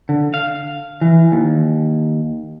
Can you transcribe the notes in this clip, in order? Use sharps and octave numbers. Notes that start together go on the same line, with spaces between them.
D3
F5
E3
D#2